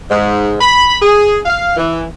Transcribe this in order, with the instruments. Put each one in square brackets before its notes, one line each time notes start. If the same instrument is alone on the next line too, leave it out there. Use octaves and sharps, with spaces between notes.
[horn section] G#2
B5
G#4
F5
E3